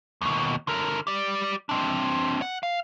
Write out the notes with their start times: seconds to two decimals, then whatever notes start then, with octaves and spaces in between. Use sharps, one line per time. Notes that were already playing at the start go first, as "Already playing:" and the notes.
0.22 D#2 B2
0.67 D3 A#4
1.07 G4 D5
1.69 C4 D4
2.42 F#5
2.63 F5